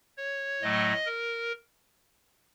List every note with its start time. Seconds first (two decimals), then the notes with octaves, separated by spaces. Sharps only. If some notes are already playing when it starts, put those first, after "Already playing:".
0.17 C#5
0.61 A2 F#3 A3 D#5
1.06 A#4